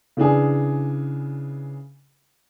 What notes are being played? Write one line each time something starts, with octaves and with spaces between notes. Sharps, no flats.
C#3 E3 D4 G#4